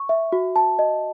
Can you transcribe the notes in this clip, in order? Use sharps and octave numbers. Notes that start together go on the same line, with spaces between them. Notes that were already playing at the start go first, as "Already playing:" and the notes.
Already playing: C#6
E5
F#4
A5
D#5